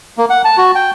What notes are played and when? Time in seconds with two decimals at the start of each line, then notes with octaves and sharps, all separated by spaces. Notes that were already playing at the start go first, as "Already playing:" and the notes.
0.18 A#3
0.30 F#5
0.45 A5
0.58 F#4
0.75 G5